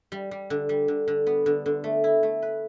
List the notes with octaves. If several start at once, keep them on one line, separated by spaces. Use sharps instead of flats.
G3
G3
D3
G3
D3
D3
B3
D3
D3
A3
E4
A3
B4